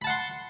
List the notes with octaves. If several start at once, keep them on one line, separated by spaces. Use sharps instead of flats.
F#5 A5 B5 C6